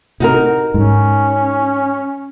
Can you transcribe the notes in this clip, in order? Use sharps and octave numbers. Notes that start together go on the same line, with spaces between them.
C3 D#4 F#4 A#4
G#2 C#4